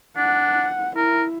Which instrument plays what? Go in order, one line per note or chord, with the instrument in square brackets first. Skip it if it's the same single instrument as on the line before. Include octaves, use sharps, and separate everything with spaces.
[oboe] D4 [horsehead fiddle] F#5
[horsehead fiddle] E4 [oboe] A#4